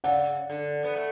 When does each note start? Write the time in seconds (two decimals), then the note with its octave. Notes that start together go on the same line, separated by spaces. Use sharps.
0.04 C#3 D5 F#5
0.50 D3
0.84 B3
0.96 A3